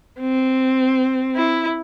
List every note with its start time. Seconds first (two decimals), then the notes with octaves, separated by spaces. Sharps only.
0.20 C4
1.36 E4